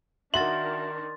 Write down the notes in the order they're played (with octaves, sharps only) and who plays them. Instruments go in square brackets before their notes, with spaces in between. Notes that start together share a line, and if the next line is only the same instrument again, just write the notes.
[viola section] D#3 D4 [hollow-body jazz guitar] F#4 E5 [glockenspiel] C6 A6 [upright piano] F#7